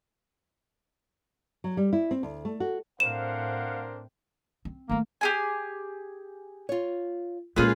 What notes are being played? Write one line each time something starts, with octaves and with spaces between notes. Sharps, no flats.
F#3
G3
E4
C4
D2
A3
F#4
A2 C4 D4 A#4 C5 F5 F#5 E7
C4
D#3 A3 A#3
G4 G#4 G#5
F4 C#5
A#2 G#3 A#3 C#4 F4 G#4 A4 B4